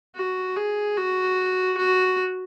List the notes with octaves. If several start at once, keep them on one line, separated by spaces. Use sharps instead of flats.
F#4
G#4
F#4
F#4